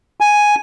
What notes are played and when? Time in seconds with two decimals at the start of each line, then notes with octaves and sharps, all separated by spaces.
0.20 G#5